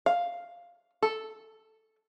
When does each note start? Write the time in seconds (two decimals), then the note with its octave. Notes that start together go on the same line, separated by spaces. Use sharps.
0.06 F5
1.02 A4